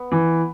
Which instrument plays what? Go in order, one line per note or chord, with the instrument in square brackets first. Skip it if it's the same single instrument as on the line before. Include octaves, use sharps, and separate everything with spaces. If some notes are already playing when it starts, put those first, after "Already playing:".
Already playing: [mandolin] B3
[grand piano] E3